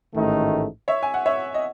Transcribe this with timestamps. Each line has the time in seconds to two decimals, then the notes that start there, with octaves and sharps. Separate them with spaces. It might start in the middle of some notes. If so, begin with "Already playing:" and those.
0.14 A1 G#2 D#3 A3 D#4
0.88 C#5 E5
1.03 G#5
1.14 F#5
1.26 C#5 E5
1.54 D#5